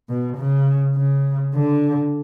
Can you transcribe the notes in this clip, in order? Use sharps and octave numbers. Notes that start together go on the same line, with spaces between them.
B2
C#3
C#3
D3